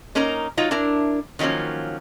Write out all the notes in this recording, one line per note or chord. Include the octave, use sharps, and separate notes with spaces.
A#3 C#4 D#4 A#4 A#5
F#3 D#4 F4
D4 E4 A#4
D#3 F3 F#3 A#3 C#4